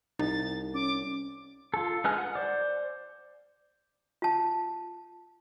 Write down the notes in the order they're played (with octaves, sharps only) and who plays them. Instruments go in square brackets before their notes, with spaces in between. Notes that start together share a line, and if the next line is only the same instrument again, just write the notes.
[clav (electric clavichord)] C2 [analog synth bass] D#4 [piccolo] A6
[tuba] C#4 [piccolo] D6
[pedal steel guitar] F4 A4
G#3 D#4 B4 G#5 F6
F#5
C5 D5
[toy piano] F4 A5